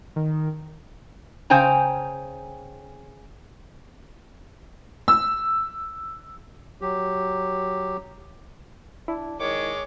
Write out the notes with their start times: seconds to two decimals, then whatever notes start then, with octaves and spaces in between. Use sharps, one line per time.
0.16 D#3
1.50 C#3 C5 G5 G#5 A#5
5.08 E6
6.82 F#3 G4
9.08 D4 E4
9.40 D#3 G#3 C#5 D6